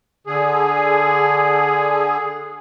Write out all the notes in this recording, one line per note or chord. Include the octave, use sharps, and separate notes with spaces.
D3 G#4